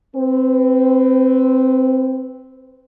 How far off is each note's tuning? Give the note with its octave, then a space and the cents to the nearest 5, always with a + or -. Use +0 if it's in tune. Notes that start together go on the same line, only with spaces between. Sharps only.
C4 +0 B4 +30